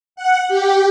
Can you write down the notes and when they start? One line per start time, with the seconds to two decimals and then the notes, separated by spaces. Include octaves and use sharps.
0.16 F#5
0.48 G4